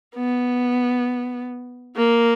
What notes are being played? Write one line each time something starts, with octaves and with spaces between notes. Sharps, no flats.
B3
A#3